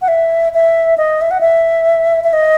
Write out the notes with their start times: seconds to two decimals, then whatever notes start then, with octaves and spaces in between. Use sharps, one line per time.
0.02 F#5
0.08 E5
0.54 E5
0.98 D#5
1.21 E5
1.31 F#5
1.41 E5
2.24 E5
2.33 D#5